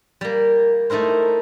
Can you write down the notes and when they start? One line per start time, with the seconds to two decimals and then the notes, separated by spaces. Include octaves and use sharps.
0.21 G3 A#3
0.90 A3 D#4 E4 A#4 C5